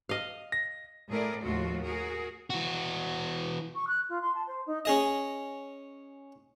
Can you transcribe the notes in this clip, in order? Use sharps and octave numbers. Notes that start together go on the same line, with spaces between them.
D#5 F5
A#6
A2 A3 G#4 A#4 D5
D#2 A2 F3 F4 F#4
F#4 G#4 A#4
E3 F#4
C#6
F#6
F4
C6
A5
C5
D#4
C#4 G#4 D#5